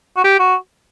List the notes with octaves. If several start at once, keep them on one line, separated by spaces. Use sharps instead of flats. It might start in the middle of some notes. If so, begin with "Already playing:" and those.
F#4
G4
F#4